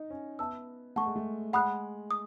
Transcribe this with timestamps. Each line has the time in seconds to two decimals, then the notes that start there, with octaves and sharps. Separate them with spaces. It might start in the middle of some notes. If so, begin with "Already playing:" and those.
Already playing: D#4 D#5
0.10 C#4
0.39 B3 E5 A5 E6
0.96 A3 F#5 A5 C#6
1.05 G#3
1.16 A3
1.53 G#3 F#5 B5 D#6 F#6
2.11 D#6